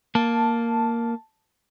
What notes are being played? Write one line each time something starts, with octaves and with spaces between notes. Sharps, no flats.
A#3 A5